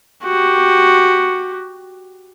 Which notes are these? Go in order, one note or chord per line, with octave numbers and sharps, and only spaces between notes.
F#4 G4